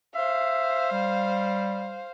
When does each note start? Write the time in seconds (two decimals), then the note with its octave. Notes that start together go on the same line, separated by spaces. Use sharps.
0.15 C5 E5 F5
0.92 G3